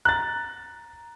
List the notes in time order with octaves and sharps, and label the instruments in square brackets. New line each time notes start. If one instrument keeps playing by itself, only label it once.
[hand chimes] A#5 [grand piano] F#6 A6